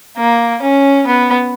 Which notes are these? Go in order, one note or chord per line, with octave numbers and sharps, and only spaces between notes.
A#3
C#4
B3